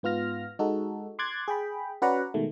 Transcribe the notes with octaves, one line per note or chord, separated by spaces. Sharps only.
G#2 B3 F4 F6 A#6
G#3 D#4 F#4 A4
C6 D6 F#6 G#6 A6
G#4 G5 B5
C#4 F#4 B4 D5 F#5 A#5
B2 D#3 G#3 A3